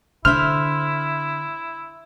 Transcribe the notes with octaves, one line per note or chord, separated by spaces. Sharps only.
D3 E4 C5 E5 F6